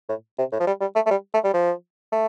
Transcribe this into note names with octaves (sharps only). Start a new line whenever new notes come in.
A2
C3
A2
F3
G3
G3
A3
A3
G3
A3
G3
F3
A3